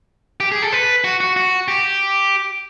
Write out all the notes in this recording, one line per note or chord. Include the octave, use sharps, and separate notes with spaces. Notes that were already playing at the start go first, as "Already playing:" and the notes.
G4
G#4
A4
B4
F#4
F#4
F#4
G4